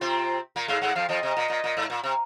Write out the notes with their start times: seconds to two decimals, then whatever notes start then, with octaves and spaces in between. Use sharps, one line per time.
0.01 C3 C4 F4
0.56 A#2 A#3
0.68 G#2 G#3 F5
0.82 G#2 G#3 F#5
0.95 F2 F3 F5
1.09 F2 F3 D#5
1.23 C3
1.37 A#2
1.50 A#2
1.64 A#2
1.77 G#2
1.90 A#2
2.03 C3